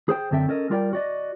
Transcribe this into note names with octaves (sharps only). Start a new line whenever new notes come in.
G#4 C5 G5
F#2 D3 C4 A4 E5 G5
C#4 A4 A#4 D#5
G3 F4 A#4 D5 D#5 G5
F#4 D5 D#5